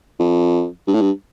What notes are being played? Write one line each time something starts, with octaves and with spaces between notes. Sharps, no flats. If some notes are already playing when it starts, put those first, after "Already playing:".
F2
G2
A2
G2